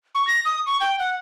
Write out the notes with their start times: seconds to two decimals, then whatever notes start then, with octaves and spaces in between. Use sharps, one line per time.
0.15 C#6
0.27 A#6
0.45 D#6
0.66 C#6
0.81 G5
0.99 F#5